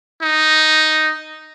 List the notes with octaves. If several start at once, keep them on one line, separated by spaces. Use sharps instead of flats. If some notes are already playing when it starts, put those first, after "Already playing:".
D#4